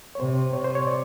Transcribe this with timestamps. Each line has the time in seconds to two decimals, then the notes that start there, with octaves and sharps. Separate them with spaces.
0.15 C#5
0.20 C3 C5
0.53 C3 C#5
0.64 C5
0.75 C#5
0.87 D5